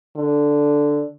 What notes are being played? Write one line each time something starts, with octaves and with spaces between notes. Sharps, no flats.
D3